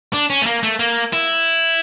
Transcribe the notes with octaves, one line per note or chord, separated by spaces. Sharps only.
D4
C#4
A3
A#3
A3
A#3
E4